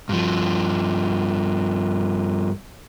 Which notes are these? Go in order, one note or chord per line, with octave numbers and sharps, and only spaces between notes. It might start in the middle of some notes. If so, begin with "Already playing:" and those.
G2 F3